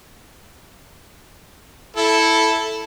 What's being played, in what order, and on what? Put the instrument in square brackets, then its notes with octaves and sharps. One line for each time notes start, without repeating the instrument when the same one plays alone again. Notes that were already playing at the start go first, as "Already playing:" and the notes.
[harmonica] E4 A4